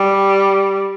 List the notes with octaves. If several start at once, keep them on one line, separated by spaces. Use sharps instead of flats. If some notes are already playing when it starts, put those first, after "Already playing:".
Already playing: G3